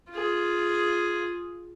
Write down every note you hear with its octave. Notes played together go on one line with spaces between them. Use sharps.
F4 G#4